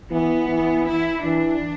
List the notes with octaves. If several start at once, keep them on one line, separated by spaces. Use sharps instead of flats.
E3 B3
E3
E4
E3 D4